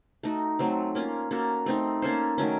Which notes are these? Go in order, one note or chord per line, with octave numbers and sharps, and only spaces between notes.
A3 D#4 F#4
F#3 A3 C4
A#3 C#4 F4
A#3 C#4 F#4 A4
A3 C4 D#4
A#3 C#4 A4 C5
D#3 F#3 A3 C#4